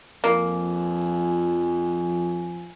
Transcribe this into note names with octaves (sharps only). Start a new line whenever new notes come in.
F2 F3 A#3 G#5